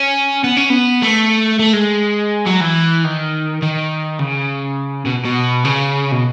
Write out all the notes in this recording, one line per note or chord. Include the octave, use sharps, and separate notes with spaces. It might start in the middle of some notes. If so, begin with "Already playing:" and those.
Already playing: C#4
B3
C#4
B3
A3
A3
G#3
F#3
E3
D#3
D#3
C#3
B2
B2
C#3
B2